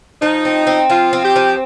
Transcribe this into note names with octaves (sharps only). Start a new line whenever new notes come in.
F3 D#4
C4
C4
F3 F4
C4
G4
F3